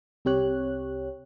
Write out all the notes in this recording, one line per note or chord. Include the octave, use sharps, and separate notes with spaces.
C2 C4 G4 C#5 F#6